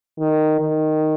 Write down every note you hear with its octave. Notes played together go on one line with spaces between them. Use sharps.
D#3
D#3